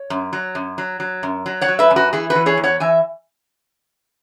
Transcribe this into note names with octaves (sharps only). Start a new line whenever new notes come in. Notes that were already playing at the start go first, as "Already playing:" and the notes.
Already playing: C#5
F#2
F#3
F#2
F#3
F#3
F#2
F#3
C#5 F#5
F#3
B4 E5
F#2
F#4 B4
E3 E4 G#4
F#4 B4
E3
G#4 C#5
E2
C#5 F#5
E3 E5 G#5